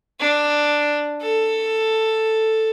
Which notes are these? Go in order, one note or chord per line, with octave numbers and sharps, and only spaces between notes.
D4
A4